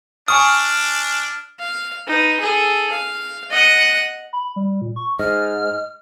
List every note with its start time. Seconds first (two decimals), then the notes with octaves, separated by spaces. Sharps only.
0.28 D4 G#5 C#6 D#6 F6
1.59 F5
2.07 D#4 B4
2.40 G#4 A4
2.92 F5
3.50 D#5 F#5
4.33 B5
4.56 G3
4.81 A#2
4.96 C#6
5.19 G#2 D#5 F6